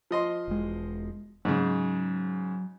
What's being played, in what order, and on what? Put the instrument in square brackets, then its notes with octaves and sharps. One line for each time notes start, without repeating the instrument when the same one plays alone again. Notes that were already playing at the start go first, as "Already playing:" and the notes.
[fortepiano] F3 D#5 C6
[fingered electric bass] E1 G#3
[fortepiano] G#2 C#3 [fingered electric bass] F#3